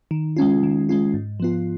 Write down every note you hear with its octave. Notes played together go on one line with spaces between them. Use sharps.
D#3
G#3 C#4 F4
D#3
G#3 C#4 F4
G#2
F3 B3 F4